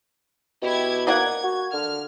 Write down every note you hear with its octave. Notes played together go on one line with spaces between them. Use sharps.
B2 E4 G4 G#6
A#3 D5 F#5 G#6
F#4
D3 F6